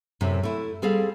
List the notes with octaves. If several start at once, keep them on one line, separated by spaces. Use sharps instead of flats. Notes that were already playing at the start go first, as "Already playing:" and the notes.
F#2 A2 C3
A3 E4
G3 C4 G#4 A4 F5